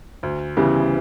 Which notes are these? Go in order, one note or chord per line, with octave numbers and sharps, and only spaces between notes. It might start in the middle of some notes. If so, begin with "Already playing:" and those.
D2
C#3 E3 G3 B3